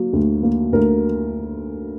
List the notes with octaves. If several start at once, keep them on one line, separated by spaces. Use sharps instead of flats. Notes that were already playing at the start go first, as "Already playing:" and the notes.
Already playing: F#3 A#3
D2
A#3
D2 A#4